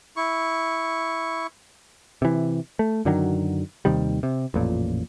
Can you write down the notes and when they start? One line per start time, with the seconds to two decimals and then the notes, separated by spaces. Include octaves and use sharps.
0.16 E4 C#6
2.22 C3 E3
2.79 A3
3.05 F#2 D3 D#3 F#3
3.85 D#2 C3 D#3 G3
4.23 C3
4.54 A1 F2 A#2